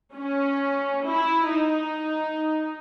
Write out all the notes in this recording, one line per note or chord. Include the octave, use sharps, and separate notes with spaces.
C#4
E4
D#4